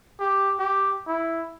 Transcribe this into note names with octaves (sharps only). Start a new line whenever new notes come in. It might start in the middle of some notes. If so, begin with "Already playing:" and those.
G4
G4
E4